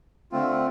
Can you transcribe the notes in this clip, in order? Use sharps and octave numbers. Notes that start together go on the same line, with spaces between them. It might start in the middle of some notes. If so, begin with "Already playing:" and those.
D3 A3 C4 F4